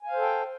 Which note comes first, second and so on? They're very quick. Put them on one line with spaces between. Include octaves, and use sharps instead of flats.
G#5 F5 C5 A4 G5